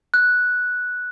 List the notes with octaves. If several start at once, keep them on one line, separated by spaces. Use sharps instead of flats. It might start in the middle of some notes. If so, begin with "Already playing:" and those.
F#6